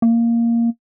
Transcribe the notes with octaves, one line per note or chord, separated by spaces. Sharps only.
A#3